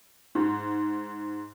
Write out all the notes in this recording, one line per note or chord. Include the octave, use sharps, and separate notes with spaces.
G#2